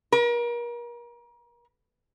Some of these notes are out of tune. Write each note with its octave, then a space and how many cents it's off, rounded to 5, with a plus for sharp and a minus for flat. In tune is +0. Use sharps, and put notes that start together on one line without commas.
A#4 +35